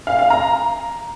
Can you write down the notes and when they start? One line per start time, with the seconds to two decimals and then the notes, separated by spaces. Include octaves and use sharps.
0.07 F5
0.19 F5
0.30 A#5